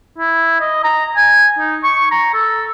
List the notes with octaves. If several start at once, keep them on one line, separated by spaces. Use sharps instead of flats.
E4
D#5
A#5
G#5
D#4
C#6
A#5
A4